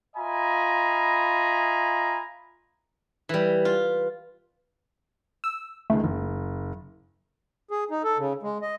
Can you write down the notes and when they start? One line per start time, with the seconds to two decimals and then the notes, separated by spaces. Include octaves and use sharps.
0.17 F4 D#5 E5 G#5 A#5 B5
3.29 E3 G3 B4
3.65 F4
5.44 E6
5.90 C#2 D#3 G#3 A3
6.04 F#1
7.71 G#4
7.91 D#4
8.04 A4
8.18 C#3
8.43 G#3
8.62 D#5